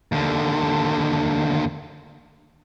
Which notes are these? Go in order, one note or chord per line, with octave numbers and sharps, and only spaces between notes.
D#2 D3